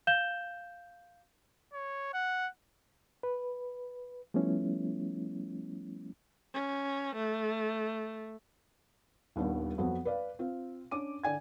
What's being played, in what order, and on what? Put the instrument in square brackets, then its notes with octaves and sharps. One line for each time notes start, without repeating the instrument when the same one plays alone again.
[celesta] F5 G6 E7 G7
[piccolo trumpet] C#5
F#5
[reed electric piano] B4
F3 G3 A3 B3 C#4 E4
[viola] C#4
A3
[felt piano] D#1 D#2 G3 B3 D4
F2 F#3 B3 C4
B4 D5 F5
C4 F4
C#4 D4 D6 D#7
D3 D5 G#5 G#6